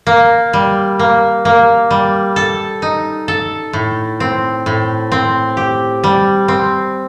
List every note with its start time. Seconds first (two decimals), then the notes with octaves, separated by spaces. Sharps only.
0.07 A#3
0.53 G3
0.99 A#3
1.45 A#3
1.91 G3
2.36 A4
2.82 D#4
3.28 A4
3.73 A2
4.20 C4
4.66 A2
5.12 C4
5.57 G4
6.04 G3
6.48 C4